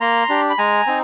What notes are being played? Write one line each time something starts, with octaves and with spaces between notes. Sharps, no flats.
A#3 A#5 C6
D4 G4
B5
G#3 G#5 A#5
C4 D#4